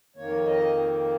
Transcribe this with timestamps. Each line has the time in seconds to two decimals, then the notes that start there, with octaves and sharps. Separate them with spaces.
0.16 F2 D#3 A#3 C#5
0.46 D#5